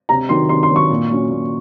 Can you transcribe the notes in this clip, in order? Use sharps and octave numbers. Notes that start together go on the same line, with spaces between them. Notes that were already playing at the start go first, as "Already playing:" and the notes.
C3 A#5
D#3 F#3 C6
C3 C6
C6
D#3 F#3
C#6
A#2
F#3 C#4
A#2